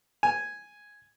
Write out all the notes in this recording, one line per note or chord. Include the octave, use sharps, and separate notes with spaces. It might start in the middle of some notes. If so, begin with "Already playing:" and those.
G#5